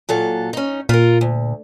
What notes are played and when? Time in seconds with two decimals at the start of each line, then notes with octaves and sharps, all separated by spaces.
0.09 A#2 F#3 A4
0.53 C#4 D#4
0.89 A#2 F4 A#4
1.21 D2